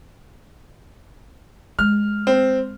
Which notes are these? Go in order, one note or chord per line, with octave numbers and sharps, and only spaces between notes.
G#3 F6
C4